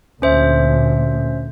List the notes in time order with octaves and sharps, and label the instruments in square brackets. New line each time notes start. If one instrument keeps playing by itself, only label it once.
[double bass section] D2 A#2 [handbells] C#4 C5 E5